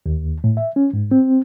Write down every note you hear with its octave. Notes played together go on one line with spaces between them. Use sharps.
D#2
A2
E5
C#4
G#2
C4